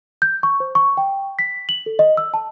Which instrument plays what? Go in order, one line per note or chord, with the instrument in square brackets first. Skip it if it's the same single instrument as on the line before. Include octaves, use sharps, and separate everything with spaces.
[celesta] G6
C#6
C5
C#6
G5
B6
F#7
A4
D#5
E6
A5